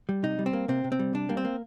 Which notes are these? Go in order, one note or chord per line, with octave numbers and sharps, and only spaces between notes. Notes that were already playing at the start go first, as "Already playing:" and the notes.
G3
C3 D#4
G3
C4
A#3
C3 C4
C3
C4
G3
C3 D4
G3 A#3
C4
A#3